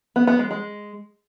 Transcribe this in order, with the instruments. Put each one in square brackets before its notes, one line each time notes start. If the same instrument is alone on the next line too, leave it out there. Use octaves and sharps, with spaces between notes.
[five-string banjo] B3
B3
G#3
G#3